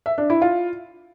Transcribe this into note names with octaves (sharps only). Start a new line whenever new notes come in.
E5
D4
E4
F4